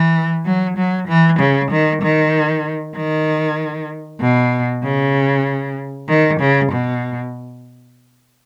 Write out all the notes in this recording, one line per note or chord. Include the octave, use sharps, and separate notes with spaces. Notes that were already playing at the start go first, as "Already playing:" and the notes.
Already playing: E3
F#3
F#3
E3
C#3
D#3
D#3
D#3
B2
C#3
D#3
C#3
B2